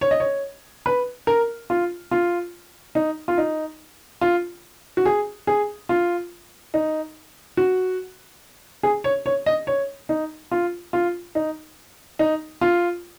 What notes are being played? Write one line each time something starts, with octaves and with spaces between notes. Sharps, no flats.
C#5
D#5
C#5
B4
A#4
F4
F4
D#4
F4
D#4
F4
F#4
G#4
G#4
F4
D#4
F#4
G#4
C#5
C#5
D#5
C#5
D#4
F4
F4
D#4
D#4
F4